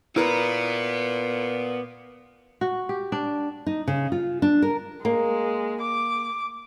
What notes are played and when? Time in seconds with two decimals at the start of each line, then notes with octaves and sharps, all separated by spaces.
0.16 A#2 B3 E4 A#4 B4
2.61 F#4
2.89 G4
3.12 D4
3.67 D#4
3.88 C#3
4.12 F4
4.42 D4
4.62 A#4
5.05 G#3 A#3
5.81 D6